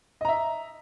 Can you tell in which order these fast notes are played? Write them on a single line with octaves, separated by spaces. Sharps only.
D#5 A#5 E5